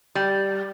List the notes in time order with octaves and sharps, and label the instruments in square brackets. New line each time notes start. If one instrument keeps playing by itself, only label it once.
[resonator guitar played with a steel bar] G3